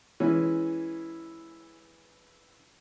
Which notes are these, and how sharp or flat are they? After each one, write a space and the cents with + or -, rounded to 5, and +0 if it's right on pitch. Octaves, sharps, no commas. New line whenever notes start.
E3 +0 G#3 +0 C#4 +0